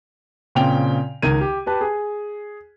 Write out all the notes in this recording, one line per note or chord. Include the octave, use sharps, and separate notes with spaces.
A#2 C#3 C4 G5 F7
C#2 D#3 A#4 G#6 D#7
G4
G4 B4 A5
G#4 G#5